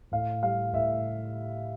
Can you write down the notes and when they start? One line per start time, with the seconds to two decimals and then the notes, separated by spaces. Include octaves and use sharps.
0.12 A2 F5
0.43 G3 F5
0.73 A2 E5